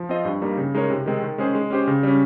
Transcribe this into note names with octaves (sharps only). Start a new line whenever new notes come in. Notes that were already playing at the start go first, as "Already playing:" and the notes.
Already playing: F3
C4 F4 C5 D#5
G2
G3 A#3 D#4
C#3
G#3 D#4 A#4 C#5
C3
D#3 G#3 C4
D#3
G#3 C#4 G#4 C5
G#3
C#4 G4 C5
C#3
G3 C#4